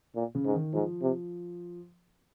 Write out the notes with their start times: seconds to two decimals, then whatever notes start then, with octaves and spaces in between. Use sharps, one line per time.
0.16 A#2
0.35 C#3
0.45 G#2
0.54 D#3
0.73 G#2 F3
1.02 C3